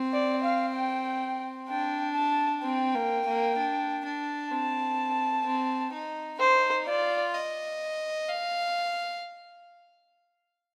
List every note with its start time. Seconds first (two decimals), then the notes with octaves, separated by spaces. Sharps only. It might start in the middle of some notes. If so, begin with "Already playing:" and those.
Already playing: C4
0.13 D5
0.44 F5
0.75 G5
1.69 D4 G5
2.16 A5
2.63 C4 G5
2.94 A#3
3.26 A#3
3.58 D4
4.05 D4
4.51 C4 A5
5.46 C4
5.93 D#4
6.40 D#4 C5
6.86 F4 D5
7.34 D#5
8.28 F5